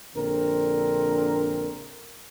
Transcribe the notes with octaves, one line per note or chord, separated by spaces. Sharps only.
A#1 D3 C4 A#4